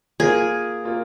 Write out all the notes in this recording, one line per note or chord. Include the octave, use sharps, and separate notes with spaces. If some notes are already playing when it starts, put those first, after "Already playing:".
A#3 F4 G#4 A#4
A#3 F4 A#4